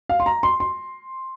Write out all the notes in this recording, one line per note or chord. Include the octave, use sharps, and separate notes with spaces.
F5
C6
A#5
C6
C6